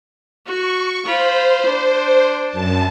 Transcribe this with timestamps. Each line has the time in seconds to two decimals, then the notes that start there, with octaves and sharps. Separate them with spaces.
0.46 F#4 C#6
1.06 F4 C5 B5
1.66 D4
2.48 F#2 A5